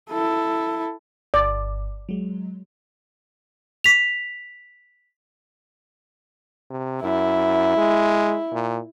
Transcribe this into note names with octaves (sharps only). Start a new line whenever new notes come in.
E4 A4
G1 D5
F#3 G#3
B6 F7
C3
F#2 E4
G#3
A#2